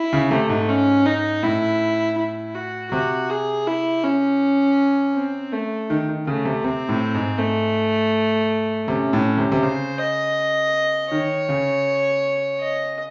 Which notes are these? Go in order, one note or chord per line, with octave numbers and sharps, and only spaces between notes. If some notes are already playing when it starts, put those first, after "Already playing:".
Already playing: E4
C#3
C3 A3
G#2
C#4
D#4
A2 E4
E4
F#4
C3 F#4
G#4
E4
C#4
C4
A3
D#3
D#3
C#3 A3
C3
C3 C4
A2
G#2
A3
C3 C#4
A2
C3
C3
C#3 C5
D#5
D#3 C#5
C#3
D#5